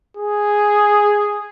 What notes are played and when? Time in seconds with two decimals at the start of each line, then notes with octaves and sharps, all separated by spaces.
0.17 G#4